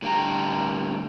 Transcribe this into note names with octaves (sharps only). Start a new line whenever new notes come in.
A2 D3 G3 E4 G5 A#5